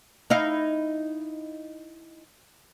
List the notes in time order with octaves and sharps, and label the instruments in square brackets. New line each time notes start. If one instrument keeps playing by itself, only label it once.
[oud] D#4 E4 F5